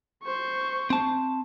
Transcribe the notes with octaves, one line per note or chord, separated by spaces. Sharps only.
C5 C#6
C4 A5